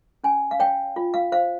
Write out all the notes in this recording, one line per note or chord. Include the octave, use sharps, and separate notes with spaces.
C#4 G#5
F5
C#5 G5
F4
F5
C5 F5